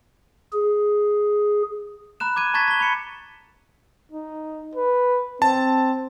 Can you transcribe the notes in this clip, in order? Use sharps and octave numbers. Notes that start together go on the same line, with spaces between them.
G#4
A#5 B5 F#6 E7
D6 G#6 D#7
A5 A#5 C#6 G#6 A6 B6
B6 G7
B5 C#7
D#4
B4
C4 A5